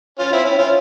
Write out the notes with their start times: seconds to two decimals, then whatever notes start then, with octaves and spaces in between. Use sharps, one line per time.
0.19 C#4 F4
0.32 C4 E4
0.44 C#4
0.58 C#4 F4